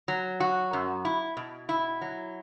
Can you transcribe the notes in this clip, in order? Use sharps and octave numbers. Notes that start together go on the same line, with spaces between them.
F#3
F#4
F#2
E4
B2
E4
F#3